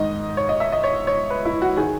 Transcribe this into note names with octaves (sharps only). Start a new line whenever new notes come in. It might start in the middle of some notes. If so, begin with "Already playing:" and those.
Already playing: G#2 D#3 D#5
C#5
D#5
E5
D#5
C#5
C#5
B4
E4
F#4
D#3 G#4